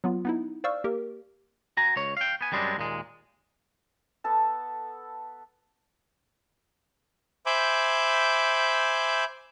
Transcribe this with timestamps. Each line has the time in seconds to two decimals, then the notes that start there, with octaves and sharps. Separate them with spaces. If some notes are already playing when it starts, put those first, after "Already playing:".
0.04 F#3 B3 F4
0.25 B3 D#4 E4
0.64 C5 D5 F5 C#6 E6 F6
0.84 A#3 G4 A#4
1.77 F#4 G#5 A#5
1.96 C#2 C#5
2.17 F5 G5
2.41 B3 G#5
2.52 F#2 G3 G#3 C4 D4
2.77 D#2 A#2 G#3
4.24 B3 A4 A5
7.46 C5 E5 G#5 B5 D6 G6